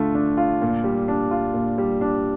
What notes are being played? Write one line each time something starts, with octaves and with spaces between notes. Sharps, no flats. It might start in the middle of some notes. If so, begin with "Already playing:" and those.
Already playing: D3 A3 F4
D4
F4
A#2
G3
D4
F4
A#2
G3
D4